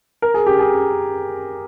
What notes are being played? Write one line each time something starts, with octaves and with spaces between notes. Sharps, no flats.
A#4
G#4
G4
G#4